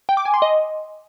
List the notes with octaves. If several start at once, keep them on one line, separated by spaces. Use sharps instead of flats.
G5
D6
G#5
C6
D#5